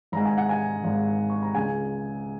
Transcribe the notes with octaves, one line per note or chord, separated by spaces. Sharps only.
G#1 G#2 G#3 A#5
G#5
F#5
G#5
G#1 G#2 G#3
C#6
A#5
C#2 C#3 G#3 G#5